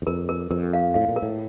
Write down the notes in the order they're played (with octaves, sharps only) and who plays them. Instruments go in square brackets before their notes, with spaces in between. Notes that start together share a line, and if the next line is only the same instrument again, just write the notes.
[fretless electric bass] E2
[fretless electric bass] F2 [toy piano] A#4
[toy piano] A#4
[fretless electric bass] F2 [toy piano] A#4
[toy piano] F5
[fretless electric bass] A2 [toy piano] F5
[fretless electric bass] A#2
[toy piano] A#4
[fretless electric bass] A2